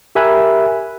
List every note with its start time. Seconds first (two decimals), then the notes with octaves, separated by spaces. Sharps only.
0.15 G4 A#4 E5 G#5 B5 F#6